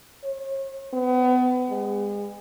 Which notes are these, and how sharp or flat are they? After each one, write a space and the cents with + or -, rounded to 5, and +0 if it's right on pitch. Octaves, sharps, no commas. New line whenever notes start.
C#5 -40
B3 +35
G#3 -30